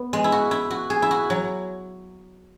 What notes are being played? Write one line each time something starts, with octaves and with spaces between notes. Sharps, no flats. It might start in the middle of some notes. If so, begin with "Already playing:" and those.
Already playing: B3
G#3
E4
F#4
E4
F#4
G#4
E4
F#4
F#3